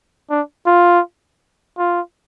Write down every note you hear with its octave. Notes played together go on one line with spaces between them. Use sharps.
D4
F4
F4